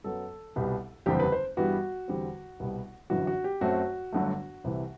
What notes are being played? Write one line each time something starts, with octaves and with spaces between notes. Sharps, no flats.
F#2 F#3 B3 A4
C2 B2 G3 B3
F#1 E2 D3 G3 C4 G4
B4
C5
G2 E3 G3 B3 F#4
E2 D3 G3 C4
C2 B2 G3 B3
G1 F#2 E3 F#4
F#4
G4
F#2 F#3 A3 C4 F#4
G1 G2 D3 F#3 A3
C2 C3 E3